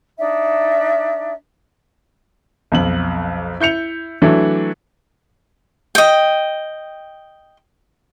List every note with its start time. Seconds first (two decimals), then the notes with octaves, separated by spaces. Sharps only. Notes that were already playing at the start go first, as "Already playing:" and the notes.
0.19 D4 D#4 E5
2.72 B1 F2 F#7
3.60 E4 G6 C#7 F7
4.22 E3 F#3 A3 D4
5.95 D#5 G5